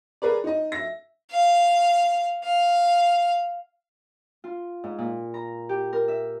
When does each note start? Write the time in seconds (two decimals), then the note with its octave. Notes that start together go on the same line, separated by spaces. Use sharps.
0.22 G#4 A#4 B4 D5
0.44 D#4 D#5
0.72 E5 A#6
1.31 F5
2.44 F5
4.44 F4
4.84 G#2
4.98 A#2
5.34 A#5
5.69 G4
5.93 A#4
6.08 E5